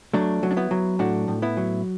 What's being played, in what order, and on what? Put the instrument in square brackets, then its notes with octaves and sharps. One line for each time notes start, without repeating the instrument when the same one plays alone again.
[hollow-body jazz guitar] F#3 A3 D4
F#3
D4
B3 E4
F#3
A2 D4 F#4
A2
B3 E4
F#3